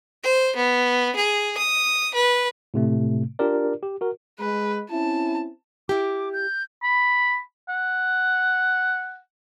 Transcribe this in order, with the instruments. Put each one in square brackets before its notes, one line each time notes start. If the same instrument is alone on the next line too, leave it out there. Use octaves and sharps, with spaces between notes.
[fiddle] C5
B3
G#4
D#6
B4
[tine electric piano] A2 C3 A3
D4 F4 G4 A#4 D5
G4
F#4 A#4
[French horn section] G#3 [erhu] B4
[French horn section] C4 C#4 E4 [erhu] A5
[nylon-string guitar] E4 G4 [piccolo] D6
[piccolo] G6
[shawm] B5
F#5